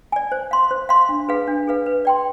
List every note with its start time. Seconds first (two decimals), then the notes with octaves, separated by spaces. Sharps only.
0.12 D5 G#5
0.32 C5
0.51 F5 C6
0.71 C5
0.89 F5 C6
1.09 D4
1.29 G#4 B4 F5
1.47 D4
1.67 G#4 B4 F5
1.86 B4
2.05 D5 G5 C6